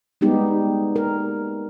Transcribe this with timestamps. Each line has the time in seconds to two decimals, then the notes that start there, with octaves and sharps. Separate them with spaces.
0.21 G3 G#3 B3 D#4 G4
0.96 A#4